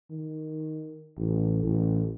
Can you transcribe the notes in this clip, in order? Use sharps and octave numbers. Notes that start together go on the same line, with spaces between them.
D#3
A1
A1